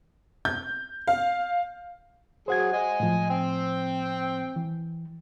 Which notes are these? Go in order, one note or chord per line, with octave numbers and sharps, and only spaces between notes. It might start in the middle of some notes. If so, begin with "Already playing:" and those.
G6
F5
F#3 G#4 C5 F#5 G#6
D#5 G#5
A2 F3
C4 G5
E3